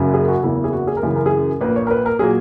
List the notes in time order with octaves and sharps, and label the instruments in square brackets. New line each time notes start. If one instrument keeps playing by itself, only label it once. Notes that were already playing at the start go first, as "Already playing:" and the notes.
Already playing: [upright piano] F#1 F#2 C#3 F#3
G#4
F#4
F#1 E2 C#3 E4
G#4
F#4
G#4
A#4
F#2 C#3 E3 G#4
A#4
G#4
A#1 A#2 A#3 B4
C#5
A#4
B4
A#4
A#2 F#3 A#3 G#4